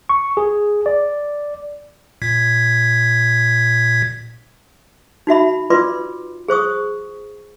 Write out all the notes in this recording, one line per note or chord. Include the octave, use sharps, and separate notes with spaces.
C#6
G#4
D5
A#2 G#6 B6
D#4 F#4 E5 B5
F4 B4 D5 C6 D6
G#4 C5 C#6 D#6